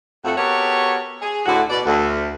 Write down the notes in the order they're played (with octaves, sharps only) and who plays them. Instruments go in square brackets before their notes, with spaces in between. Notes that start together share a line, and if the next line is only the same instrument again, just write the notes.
[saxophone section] F2 A3 F#4
B3 F#4 G4 A4 A#4 C#5
G#4
D2 A2 D3 F#4
B2 D5
D2